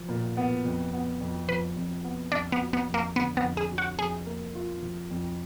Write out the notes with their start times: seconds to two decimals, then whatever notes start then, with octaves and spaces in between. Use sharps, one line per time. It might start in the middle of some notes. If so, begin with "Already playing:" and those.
Already playing: F3
0.09 A#2
0.37 B3
0.65 F2
0.93 B3
1.21 F2
1.48 F3 B4
1.76 F2
2.04 B3
2.32 F2 D4
2.52 B3
2.60 F#3
2.73 B3
2.88 F2
2.94 A#3
3.16 D3 B3
3.37 B3
3.43 F2
3.57 G#4
3.71 F#3
3.78 F#4
3.99 F2 G#4
4.26 A#3
4.55 F4
4.83 F3
5.10 F2